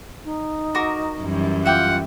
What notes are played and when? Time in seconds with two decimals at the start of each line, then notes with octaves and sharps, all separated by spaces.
0.25 D#4
0.75 F#4 A#4 D6
1.21 F#2 E3 G3
1.65 F4 E5 F#5 G5 D6